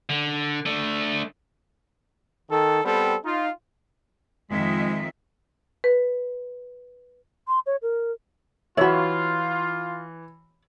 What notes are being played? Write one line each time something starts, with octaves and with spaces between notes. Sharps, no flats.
D3
A3 D4
D#3 A4
G3 B3 C4 A4
D#4 F4
F2 D#3 G#3 E5
B4
C6
C#5
A#4
E3 F4 F#4 C#5 E5 B5